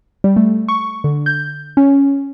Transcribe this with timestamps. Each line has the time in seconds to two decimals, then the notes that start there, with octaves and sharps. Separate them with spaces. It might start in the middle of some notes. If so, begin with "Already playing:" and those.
0.24 G3
0.36 A3
0.69 C#6
1.04 D3
1.26 G6
1.77 C#4